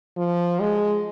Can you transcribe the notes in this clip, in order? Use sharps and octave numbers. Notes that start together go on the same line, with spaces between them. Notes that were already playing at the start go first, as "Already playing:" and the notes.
F3
G#3